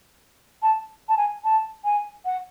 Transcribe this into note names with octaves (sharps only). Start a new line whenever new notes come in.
A5
A5
G#5
A5
G#5
F#5